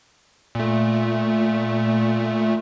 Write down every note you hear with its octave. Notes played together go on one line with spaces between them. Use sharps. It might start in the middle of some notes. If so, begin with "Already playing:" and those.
A#2 A3